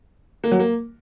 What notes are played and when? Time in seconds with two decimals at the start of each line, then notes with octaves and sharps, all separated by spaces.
0.44 A#3
0.51 F#3
0.59 A#3